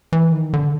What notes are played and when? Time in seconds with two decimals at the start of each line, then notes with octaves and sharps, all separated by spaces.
0.13 E3
0.32 D#3
0.53 D3